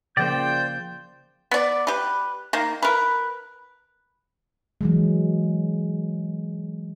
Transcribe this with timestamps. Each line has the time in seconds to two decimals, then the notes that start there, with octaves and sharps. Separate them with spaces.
0.17 C#3 F3 A#3 C5 D5 G5 G6
1.51 B3 D5
1.87 G4 B4
2.53 D#3 A#3
2.83 A#4 B4
4.81 E3 F#3 G#3